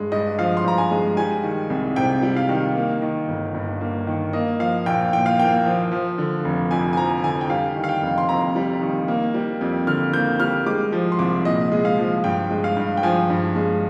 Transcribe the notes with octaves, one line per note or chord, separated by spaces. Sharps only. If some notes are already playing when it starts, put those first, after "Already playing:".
Already playing: G2 G#3
G2 D#5
F3 F5
C6
G2 A#5
G#5
G#3
G3 G#5
D#3
C2
C3 G5
G3
F5
D#3
A#3
D#3
G1
G2
A#3
D#3
A#3 D#5
F3 F5
A#1 G5
A#2 G5
F5
A#3 G5
F3
F3
D3
F1
F2 G#5
G#5
F3 A#5
D3 G#5
G5
G3 F5
D#3
F5
G5
F1
C6
F2 A#5
G3
D#3
A#3
G3
F2
D3 F6
A#3 G6
G3 F6
G#3 D6
F3
C6
C2 D6
A#2 D#5
G#3
F5
F3
G2 G5
G#3
F5
G2
G5
F3 G#5
G2
G#3